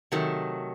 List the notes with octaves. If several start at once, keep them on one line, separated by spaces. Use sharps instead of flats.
C3 D#3 F#3 A3